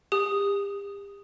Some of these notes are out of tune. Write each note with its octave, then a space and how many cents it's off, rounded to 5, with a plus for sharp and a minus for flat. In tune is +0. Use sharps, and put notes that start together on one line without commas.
G4 +35 D#6 +0